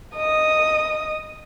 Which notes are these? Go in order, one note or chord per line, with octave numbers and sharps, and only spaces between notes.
D#5 D#6